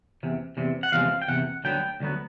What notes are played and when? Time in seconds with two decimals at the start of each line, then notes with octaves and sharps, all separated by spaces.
0.23 E2 C3
0.57 E2 C3
0.83 F#5
0.92 E2 C3 F3 G#3 F5
1.22 G5
1.28 E2 C3 F#5
1.65 D2 D3 F#3 B3 G5
2.00 D2 D3 F#3 B3